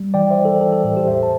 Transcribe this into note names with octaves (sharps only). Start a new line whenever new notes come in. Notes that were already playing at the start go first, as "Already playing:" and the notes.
Already playing: G3
E3 D5 G5
C5 E5
E3
A4
E3 A4
A4
A2 A4
G4 C5
E2 C5 E5
A5